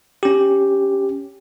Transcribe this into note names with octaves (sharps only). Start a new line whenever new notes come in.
C#4 G4